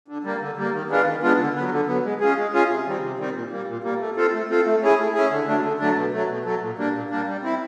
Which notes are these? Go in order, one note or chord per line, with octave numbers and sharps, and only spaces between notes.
D3
G3 A#3
D3
G3 A#3
D#3
G#3 B3 D4 F4
D#3
G#3 B3 D4 F4
D3
F#3 B3
D3
F#3 B3
G#3
C#4 F4 G#4
G#3
C#4 F4 G#4
C3
D#3 G3 C4
C3
D#3 G3 C4
A#2
G3 A#3
A#2
G3 A#3
A3
C4 F4 A4
A3
C4 F4 A4
A3
C#4 E4 G#4
A3
C#4 E4 G#4
D3
F#3 A3 D4
D3
F#3 A3 D4
B2
F#3 A3
B2
F#3 A3
A#2
G3 A#3 D4
A#2
G3 A#3 D4
G3
C4 E4